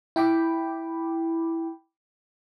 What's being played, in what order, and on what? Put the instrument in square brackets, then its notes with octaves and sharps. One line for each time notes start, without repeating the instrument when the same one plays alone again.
[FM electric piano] E4 G5 B5 D6